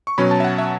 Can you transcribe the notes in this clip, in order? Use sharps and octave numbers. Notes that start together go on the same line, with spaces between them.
C#6
B2 F#3 C#4 B5
A5
E5
F#5
E5